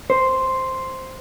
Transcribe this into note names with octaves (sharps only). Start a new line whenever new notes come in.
C5